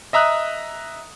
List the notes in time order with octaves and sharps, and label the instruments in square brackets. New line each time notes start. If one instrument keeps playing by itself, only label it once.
[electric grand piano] D#5 E5 A#5 D#6 F#6